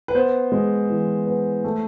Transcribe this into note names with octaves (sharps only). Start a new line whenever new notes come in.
B4
B3 C5
G#3
E3
B3
A3